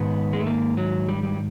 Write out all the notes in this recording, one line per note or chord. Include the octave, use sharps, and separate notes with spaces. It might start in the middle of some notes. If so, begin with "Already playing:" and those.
Already playing: G#2 D#3 B3
G#3
A3
A#3
F#3
G3
G3